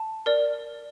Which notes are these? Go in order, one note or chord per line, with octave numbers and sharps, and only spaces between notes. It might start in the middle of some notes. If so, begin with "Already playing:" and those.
Already playing: A5
A#4 D5